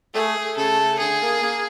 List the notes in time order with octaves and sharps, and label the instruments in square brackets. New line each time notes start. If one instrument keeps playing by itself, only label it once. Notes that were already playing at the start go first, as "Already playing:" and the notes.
[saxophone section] A3 [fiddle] G#4
[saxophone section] A3
[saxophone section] C#3 [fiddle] A4
[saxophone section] A3
[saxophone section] D3 [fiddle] G#4
[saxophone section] A#3
A#3